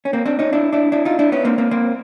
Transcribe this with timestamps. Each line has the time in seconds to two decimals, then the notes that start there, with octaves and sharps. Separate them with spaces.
0.05 C#4
0.13 A#3 C4
0.26 C4 D4
0.39 C#4 D#4
0.53 D4 E4
0.73 D4 E4
0.92 D4 E4
1.05 D#4 F4
1.19 D4 E4
1.32 B3 C#4
1.45 A#3 C4
1.58 A#3 C4
1.71 A#3 C4